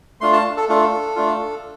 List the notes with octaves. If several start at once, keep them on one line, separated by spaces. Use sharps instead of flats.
A3 D4 F4 C6
A5
A4
A3 D4 F4 A4
A3 D4 F4